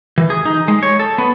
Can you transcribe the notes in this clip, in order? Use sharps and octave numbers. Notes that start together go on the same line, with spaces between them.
E3
G#4
D#4
G#3
C#5
A4
B3